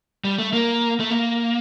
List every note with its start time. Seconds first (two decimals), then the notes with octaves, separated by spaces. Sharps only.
0.24 G3
0.38 A3
0.53 A#3
1.00 A3
1.10 A#3